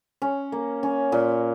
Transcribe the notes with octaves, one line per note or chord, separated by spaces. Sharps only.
C#4
A#3
C#4
A#2